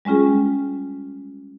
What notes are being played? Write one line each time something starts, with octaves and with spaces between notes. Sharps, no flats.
G3 G#3 C#4 F4 G#4